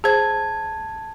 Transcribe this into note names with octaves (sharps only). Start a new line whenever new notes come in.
G#4 C5 A5 G#6